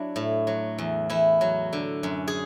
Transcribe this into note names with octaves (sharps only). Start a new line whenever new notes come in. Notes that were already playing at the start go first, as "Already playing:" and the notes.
Already playing: F#3 D4 E4
A2
F#3
E2
E2 E4
F#3
D3
F#2
G#4